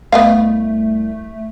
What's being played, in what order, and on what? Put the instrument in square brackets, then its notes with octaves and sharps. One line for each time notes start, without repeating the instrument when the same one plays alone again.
[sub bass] C2 [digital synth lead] A3 [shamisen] B3 D#5 F5